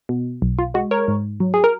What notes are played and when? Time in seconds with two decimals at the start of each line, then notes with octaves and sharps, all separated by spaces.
0.09 B2
0.42 B1
0.59 F4
0.74 G#3 F#4
0.91 A#4 C#5
1.08 G#2
1.40 F#3
1.54 G#4
1.64 A#4